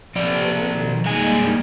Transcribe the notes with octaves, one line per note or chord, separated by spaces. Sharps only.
C3 F3 A4 B4 D5
B2 D#3
F2 G3 G#3 A#3 D#4 G#5